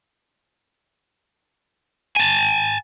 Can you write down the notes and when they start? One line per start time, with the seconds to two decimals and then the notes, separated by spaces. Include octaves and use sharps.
2.16 G#5 A5